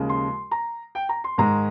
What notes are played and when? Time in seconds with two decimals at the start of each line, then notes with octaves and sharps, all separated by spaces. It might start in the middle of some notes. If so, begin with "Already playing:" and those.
Already playing: D#2 C#3 F3 G#3
0.09 C6
0.51 A#5
0.95 G5
1.09 A#5
1.24 C6
1.38 G#2 D#3 G#3 A#5